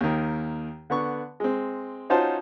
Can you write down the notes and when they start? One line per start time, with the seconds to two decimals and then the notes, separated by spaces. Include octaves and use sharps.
0.01 D#2 D#3
0.90 D3 B3 C#6
1.40 G#3 C4
2.10 C#4 D#4 F4 F#4 C5 A5